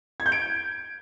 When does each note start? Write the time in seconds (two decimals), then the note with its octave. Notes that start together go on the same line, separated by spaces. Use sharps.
0.20 G#6
0.26 G6
0.32 D7